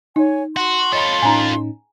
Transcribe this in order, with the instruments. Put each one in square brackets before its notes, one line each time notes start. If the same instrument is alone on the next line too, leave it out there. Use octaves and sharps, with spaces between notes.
[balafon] D#4 [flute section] C#5 G#5
[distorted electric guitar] F#4 [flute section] C6
[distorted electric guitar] F4 A4 [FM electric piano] C#5 D#5 B5
[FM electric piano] A2 C#4 D#4 [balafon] G#5 A#5